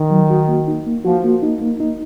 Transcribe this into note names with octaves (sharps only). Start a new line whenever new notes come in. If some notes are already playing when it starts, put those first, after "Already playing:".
Already playing: D#3
F#3
F#4
A#3
D#4
A#3
F3 F#4
A#3
D#4
A#3
D#4